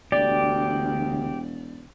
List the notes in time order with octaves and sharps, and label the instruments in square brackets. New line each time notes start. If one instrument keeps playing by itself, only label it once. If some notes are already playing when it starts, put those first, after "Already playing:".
[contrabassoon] E1 [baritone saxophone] D2 [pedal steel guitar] G4 [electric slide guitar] D5